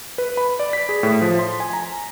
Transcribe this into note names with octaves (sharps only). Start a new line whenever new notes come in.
B4
B5
D5
B6
G#4
A2
F3
C6
G#5
A#5